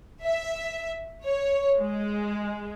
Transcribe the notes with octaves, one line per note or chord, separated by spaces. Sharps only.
E5
C#5
G#3